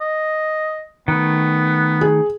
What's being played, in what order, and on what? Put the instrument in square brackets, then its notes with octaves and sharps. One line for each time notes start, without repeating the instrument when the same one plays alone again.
[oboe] D#5
[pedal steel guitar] D#3 A3 [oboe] B3
[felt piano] G#4